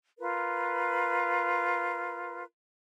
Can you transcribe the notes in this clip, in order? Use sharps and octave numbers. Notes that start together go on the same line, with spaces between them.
F4 A#4 B4